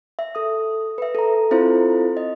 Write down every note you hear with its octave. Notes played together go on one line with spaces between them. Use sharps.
E5
A4 D#6
B4 E5
A4 A#5
C4 E4 F4 A4 C5
D#5